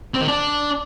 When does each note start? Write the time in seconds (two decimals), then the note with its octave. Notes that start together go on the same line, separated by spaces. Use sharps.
0.14 C4
0.21 D#3
0.28 D4